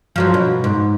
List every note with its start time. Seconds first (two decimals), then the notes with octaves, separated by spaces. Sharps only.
0.16 F3 F#3 B4
0.34 B2
0.64 G#2